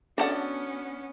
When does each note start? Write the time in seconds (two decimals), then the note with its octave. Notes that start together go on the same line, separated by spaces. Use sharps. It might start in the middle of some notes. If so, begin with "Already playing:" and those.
0.18 B3 C#4 D4 F#4 A4 D5 F#5